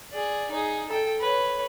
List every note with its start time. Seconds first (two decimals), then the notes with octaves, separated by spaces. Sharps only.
0.13 G#4 D5
0.51 D#4 G#4
0.89 A4 G5
1.21 B4 C#5